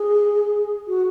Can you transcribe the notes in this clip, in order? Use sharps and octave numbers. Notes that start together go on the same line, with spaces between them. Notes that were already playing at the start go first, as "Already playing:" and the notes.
Already playing: G#4
F#4